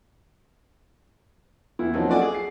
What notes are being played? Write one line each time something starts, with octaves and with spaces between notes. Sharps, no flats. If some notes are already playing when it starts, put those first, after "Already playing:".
E2 E4
F3 F#3 A#3 C4 C#4 D#4
F4 F#4 A4 D5 G#5
G#4
C7